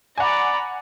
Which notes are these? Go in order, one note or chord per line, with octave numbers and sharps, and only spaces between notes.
D5 F#5 G#5 A#5 B5